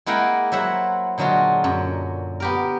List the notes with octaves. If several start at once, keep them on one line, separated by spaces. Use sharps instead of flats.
G#3 A#3 E4 A#4 F#5 G5
F#3 E4 C5 E5 F#5
A#2 D3 F#3 G#3 F4 F#4
F#2
B3 G4 A#4